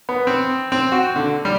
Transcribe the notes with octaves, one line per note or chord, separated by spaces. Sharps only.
B3
C4
C4
F#4
D3
G3